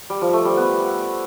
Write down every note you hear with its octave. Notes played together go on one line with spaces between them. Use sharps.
G3
F3
A3
G3
B3